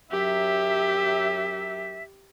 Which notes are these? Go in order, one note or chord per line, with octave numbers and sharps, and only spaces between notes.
F#2 F#3 G4 E5